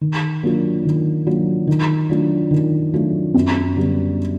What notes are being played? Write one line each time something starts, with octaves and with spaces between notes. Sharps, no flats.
D#3
F#3 A#3 D4 F4
D#3
F#3 A#3 D4 F4
D#3
F#3 A3 D4 F4
D#3
F#3 A3 D4 F4
F#2
D3 G3 B3 D4